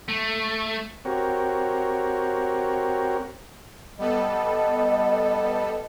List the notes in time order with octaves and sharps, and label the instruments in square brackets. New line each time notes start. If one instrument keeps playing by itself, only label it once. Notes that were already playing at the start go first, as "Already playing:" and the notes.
[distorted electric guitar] A3
[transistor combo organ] C4 F#4 G4 A#4 C#5
[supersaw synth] G3 B3 A4 [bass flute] D#5